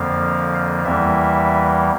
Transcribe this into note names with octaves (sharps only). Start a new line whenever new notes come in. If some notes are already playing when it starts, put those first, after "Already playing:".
Already playing: F2 D3 F3 A#3 F5
E2 E3 G3 A#3 E5